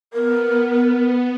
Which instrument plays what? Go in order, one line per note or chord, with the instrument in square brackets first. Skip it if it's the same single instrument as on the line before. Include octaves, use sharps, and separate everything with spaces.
[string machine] B3 [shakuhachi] A#4